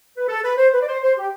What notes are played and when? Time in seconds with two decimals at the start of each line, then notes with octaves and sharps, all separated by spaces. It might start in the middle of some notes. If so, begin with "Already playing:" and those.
0.17 B4
0.28 A4
0.43 B4
0.57 C5
0.73 B4
0.80 D5
0.87 C5
1.02 C5
1.17 G4